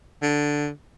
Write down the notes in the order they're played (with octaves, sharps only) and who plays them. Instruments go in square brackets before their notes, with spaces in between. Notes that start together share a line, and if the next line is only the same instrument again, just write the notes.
[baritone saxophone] D3